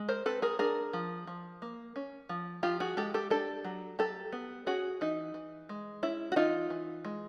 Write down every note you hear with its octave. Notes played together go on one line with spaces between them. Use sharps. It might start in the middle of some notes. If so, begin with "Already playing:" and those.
Already playing: G#3
A#4 C5
C4 A4 B4
G#4 A#4
D4 G#4 A#4
F3
F3
A#3
C#4
F3
F3 F4 G4
F#4 G#4
G#3 G4 A4
G4 A4
D4 G4 A4
F#3
F#3 G4 A4
B3
C#4 F#4 G#4
E3 D#4
E3
G#3
C#4 E4
F#4
E3 D#4 F4
E3
G#3